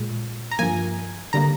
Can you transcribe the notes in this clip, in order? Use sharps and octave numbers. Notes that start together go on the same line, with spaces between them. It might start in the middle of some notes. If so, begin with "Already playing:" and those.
Already playing: A#2 G#3
A#5
G2 F3 A#3 G#5
D3 G3 A#3 A#5